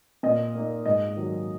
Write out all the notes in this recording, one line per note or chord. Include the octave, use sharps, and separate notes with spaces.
A#2 D#5
A#3 D#4
G#2 D#5
D#3 F#3